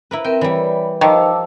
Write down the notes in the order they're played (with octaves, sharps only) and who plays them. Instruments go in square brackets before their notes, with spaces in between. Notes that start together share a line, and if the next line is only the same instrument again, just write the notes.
[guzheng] E4 A#4 B4
[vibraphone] C4 A#4 E5 [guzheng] G5
[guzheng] E3 G3 [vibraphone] C#5 D5 B5
[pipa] D#3 [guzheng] F3 [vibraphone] A5 D6 E6